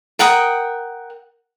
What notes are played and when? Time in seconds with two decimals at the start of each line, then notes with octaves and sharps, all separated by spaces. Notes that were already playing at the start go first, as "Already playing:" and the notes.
0.19 A#4 F#5 G5 D#6